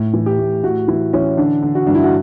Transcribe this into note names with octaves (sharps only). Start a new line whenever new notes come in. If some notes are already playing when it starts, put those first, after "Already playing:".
Already playing: A2
E3
G4
A2
A2 F#4
E3 E4
E3 C#4
D3 D4
D3
F#4
G2 D4
E4
F#4